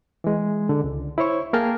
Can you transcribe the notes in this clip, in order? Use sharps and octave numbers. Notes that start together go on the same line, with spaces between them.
E3 G#3
D3
C#2
E4 C5 C#5 C#6
A#3 G#4 A#4 G5 A5 F6